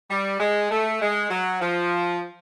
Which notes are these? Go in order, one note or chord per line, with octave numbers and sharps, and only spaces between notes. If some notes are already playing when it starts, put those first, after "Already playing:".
G3
G#3
A3
G#3
F#3
F3